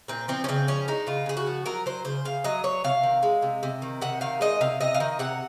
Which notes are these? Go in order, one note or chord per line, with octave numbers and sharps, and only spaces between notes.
A#2 C4
F3 C4
C#4
C#3 C4
F3 C#4
G#3 D#4
C#3 F4
C#3 G#4
F#4
F3
F#3 A#4
F#3 C5
C#3 C5
C#3 F5
F#3 D#5
F#3 C#5
C3 F5
D#3
G#3
C3
C3
D#3
C3 F#5
D#3 F5
G#3 D#5
C3 F5
C3 D#5
F5
D#3 D#5
C3 F#5